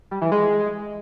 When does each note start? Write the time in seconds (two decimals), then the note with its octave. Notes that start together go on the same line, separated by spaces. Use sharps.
0.11 G3
0.21 E3
0.32 G#3